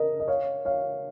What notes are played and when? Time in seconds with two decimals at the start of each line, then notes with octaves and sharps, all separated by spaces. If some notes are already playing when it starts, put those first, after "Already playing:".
Already playing: A#4 D#5
0.20 D#5
0.28 C#5 F5
0.65 C#5 F5